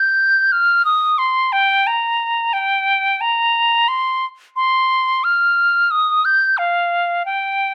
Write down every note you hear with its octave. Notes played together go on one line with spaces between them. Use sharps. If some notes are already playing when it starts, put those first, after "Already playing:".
Already playing: G6
F6
D#6
C6
G5
A#5
G5
A#5
C6
C6
F6
D#6
G6
F5
G5